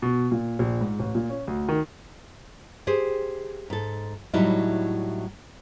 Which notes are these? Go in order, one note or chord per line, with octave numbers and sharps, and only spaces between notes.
B2
A#2
A#1
G#2
A1
A#2
C#4
D2
D#3
G4 G#4 C5
G#2 A4
A2 F#3 G3 D#4 E4